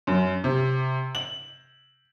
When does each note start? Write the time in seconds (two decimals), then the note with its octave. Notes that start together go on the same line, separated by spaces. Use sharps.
0.07 F#2
0.44 C3
1.15 F#7